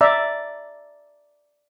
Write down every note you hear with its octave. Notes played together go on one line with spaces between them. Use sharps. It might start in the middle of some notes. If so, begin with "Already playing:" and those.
D5 E5 A#5